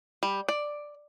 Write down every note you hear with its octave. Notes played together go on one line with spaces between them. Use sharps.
G3
D5